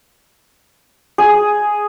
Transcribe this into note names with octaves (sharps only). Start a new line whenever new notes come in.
G#4